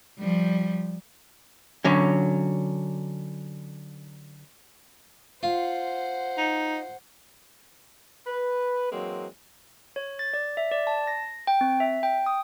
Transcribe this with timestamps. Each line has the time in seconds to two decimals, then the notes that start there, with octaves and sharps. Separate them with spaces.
0.19 F3 G3
1.84 D3 F#3 C#4
5.43 F4 C5 F#5
6.38 D#4
8.27 B4
8.92 E3 F#3 G#3 A#3 C4
9.96 C#5
10.19 A6
10.33 D5
10.57 E5
10.72 D5
10.87 A5
11.07 A#6
11.47 G5
11.61 C4
11.80 E5
12.03 G5
12.26 D#6